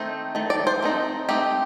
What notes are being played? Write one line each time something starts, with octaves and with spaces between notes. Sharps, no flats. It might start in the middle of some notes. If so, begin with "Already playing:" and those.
Already playing: D#3 A3 C4 D#4
D#3 A3
D5
C5
A3 C4 D#4
A3 C4 D#4 G4